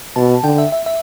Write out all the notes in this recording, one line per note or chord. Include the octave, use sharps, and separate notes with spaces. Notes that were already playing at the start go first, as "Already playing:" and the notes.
B2 A5
D3 G5
E5
E5
E5